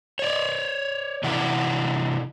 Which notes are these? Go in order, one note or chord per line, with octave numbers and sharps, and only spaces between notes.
C#5 D5
C3 E3 E4 D5 F#5